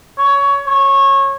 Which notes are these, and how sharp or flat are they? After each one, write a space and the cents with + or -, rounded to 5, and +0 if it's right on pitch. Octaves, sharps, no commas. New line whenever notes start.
C#5 +20
C#5 -20